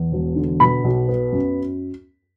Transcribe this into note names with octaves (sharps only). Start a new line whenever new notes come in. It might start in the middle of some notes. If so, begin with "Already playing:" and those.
Already playing: E2
E1
D3
B2 B5
B1
B3
F#2